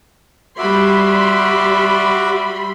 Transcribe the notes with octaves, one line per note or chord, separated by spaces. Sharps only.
G3 F#4 E5 B5 C6 D6